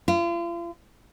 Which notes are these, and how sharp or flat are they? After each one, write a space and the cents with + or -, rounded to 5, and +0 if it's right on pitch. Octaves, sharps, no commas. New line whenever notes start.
F4 -40